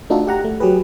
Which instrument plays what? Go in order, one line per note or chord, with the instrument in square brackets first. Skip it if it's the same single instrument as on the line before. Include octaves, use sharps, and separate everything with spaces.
[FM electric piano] A3 D4 D#4 F4 F#4 A4
G4 F#5 A#5
A3
F#3 G4 G#4 B4